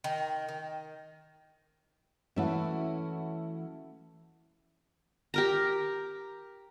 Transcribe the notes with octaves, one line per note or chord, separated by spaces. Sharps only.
D#3
D#3
E3 A3 C#4 E4 F#4 E5
G4 A#4 A#5